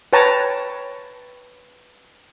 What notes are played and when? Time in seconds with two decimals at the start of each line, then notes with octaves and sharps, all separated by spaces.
0.13 B4 C#5 G5 A5 A#5